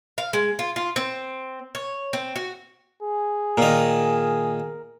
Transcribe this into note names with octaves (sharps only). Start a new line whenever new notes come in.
F5
G#3
F4
F4
C4
C#5
C4
F#4
G#4
A#2 D#3 A#4